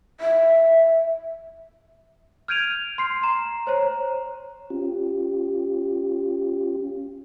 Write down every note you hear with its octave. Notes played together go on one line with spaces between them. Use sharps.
E5
F6 G6 G#6 D7 D#7 F7
C6 C7
A#5 E7
C5 C#5 A#5
C#4 F4 G4